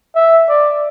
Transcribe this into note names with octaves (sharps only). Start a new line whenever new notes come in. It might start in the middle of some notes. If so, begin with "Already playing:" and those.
E5
D5